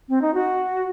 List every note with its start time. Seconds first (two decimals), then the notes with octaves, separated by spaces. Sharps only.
0.09 C4
0.22 D#4
0.34 F#4